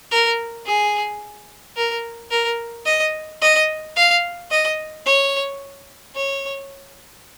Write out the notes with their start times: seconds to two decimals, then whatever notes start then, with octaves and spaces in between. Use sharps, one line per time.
0.11 A#4
0.66 G#4
1.76 A#4
2.31 A#4
2.86 D#5
3.42 D#5
3.96 F5
4.51 D#5
5.06 C#5
6.15 C#5